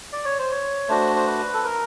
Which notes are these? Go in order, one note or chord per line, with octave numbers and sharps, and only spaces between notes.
D5
C#5
C5
C#5
A3 D4 F#4 C5
C5
B4
A4
A#4